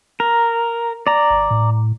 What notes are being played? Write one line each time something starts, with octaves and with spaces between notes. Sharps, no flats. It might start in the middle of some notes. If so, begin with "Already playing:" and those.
A#4
D5 A#5
G#1
A2